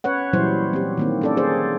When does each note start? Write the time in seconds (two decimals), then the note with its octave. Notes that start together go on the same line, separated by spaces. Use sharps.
0.04 C#4 B4 C#5 F#5
0.33 A#2 E3 F#3 G3 E4 C5
0.73 C4 G4
0.97 D#3 A#3 C4
1.22 C#4 A4 D5
1.37 G#4 C5 D5